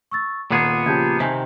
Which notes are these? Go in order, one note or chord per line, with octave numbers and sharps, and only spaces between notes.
C#6 E6 A6
D#1 A#2 B3 G#4 F#5
C#3 F3 G4 A5 G6 G#6
C3 D#3 G#5 B6